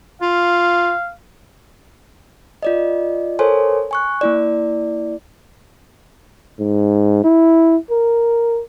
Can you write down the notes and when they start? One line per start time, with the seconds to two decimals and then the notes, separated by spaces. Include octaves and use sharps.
0.22 F4 F5
2.63 F4 D5 D#5
3.39 A4 A#4 C5 C#5 G#5 C6
3.91 G#5 C#6 F#6
4.21 A#3 E4 D5
6.60 G#2
7.24 E4
7.91 A#4